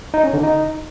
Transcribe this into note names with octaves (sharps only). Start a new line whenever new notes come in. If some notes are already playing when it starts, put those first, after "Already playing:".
D#4
C#4
D3
D#4